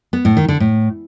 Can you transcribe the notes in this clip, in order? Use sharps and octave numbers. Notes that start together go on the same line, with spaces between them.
B3
A2
D#3
D3
A2